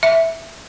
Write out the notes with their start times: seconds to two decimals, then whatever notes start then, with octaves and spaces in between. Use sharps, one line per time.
0.03 E5